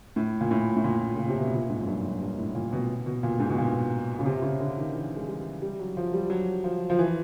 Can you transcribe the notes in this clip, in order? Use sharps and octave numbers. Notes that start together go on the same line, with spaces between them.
A2
A#2
A2
A2
A#2
C#3
C3
B2
A#2
G#2
F#2
G2
F#2
G2
A2
A#2
B2
B2
A#2
G#2
B2
A#2
C#3
C3
C#3
D3
D#3
E3
G#3
G3
G3
F#3
F3
G3
F#3
F3
F3
E3